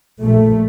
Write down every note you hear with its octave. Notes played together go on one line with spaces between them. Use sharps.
A#1 A#2 A3